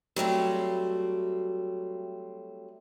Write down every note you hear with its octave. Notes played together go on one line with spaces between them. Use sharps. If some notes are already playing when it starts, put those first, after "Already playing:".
F#3 G3 A3 C4